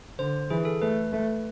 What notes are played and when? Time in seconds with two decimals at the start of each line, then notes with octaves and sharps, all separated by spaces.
0.19 D3 C5
0.50 E3 G#4
0.65 A4
0.81 A3 B4
1.12 A3